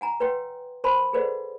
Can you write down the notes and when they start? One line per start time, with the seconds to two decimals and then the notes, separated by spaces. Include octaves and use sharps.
0.01 F#5 G#5 A#5
0.20 B4 C#5 F#5 G5 C6
0.84 A#4 C5 G#5 A5 B5 C6
1.13 G#4 A4 B4 C5 D5 F#5